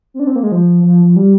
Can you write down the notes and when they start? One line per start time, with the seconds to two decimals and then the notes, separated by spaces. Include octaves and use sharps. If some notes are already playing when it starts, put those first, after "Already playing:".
0.14 C4
0.20 D4
0.27 C4
0.36 A#3
0.43 G#3
0.52 F3
0.84 F3
1.05 F3
1.16 G3